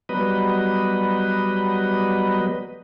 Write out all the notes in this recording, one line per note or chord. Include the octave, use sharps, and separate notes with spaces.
F#3 G3 B3 B4 D#5